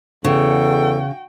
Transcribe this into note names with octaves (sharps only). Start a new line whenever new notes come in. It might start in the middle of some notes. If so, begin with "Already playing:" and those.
E2 C#3 F#4 A4 G5